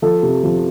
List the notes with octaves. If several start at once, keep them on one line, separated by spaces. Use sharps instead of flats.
F3 A4
C3
F3